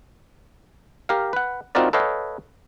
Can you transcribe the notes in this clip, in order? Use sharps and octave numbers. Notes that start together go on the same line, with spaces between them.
G4 A#4 F5
B4 F#5
C4 D#4 F4 F#4 A#4 D5
A4 B4 C#5 D#5 F5 G5